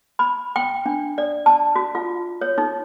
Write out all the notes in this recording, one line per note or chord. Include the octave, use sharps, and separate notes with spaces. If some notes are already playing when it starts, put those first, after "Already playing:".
B5
G5
D4
D5
A5
F#4
F4
C#5
D#4